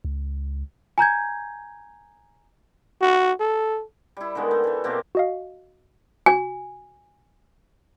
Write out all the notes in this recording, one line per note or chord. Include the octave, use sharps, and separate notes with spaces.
C#2
G#5 A#5 G6 G#6
F#4
A4
G3 E4
D3 D#3 G#3 B3
A3
E3 A3
B2 A#3 C4 G4
F#4 D#5 F5
F#4 G#5